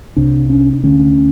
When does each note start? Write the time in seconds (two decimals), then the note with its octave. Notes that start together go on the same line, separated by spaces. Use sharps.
0.17 C2 C3 D4
0.50 C#4
0.73 D4
0.83 D2 D3 C#4